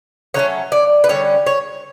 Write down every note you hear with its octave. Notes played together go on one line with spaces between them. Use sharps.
D3 F#3 A3 C#4 C#5
D5
B4
D3 G3 C#4 C#5
C#5